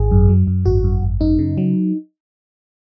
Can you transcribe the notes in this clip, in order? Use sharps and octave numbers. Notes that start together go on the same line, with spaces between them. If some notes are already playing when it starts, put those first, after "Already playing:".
Already playing: G#1 G#4
F#2
F#3
F#2
G#1 F#4
F#2
G#1
F#2 D#4
C#3
F#3